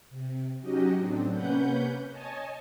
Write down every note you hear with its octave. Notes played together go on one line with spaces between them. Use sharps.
C3
F#3 C#4 D#4 F#4 G4 D#5
A2 F#3 C4 D4
C3 A#3 C#4 B4 F#5 G6
C#5 D#5 G#5 A5